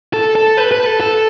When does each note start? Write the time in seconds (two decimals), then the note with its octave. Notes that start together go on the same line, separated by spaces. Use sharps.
0.13 A4
0.35 A4
0.57 B4
0.72 B4
0.86 A4
1.01 A4